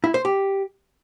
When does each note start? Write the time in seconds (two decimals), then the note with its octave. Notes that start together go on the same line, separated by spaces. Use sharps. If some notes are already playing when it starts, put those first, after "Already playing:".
0.04 E4
0.14 C5
0.25 G4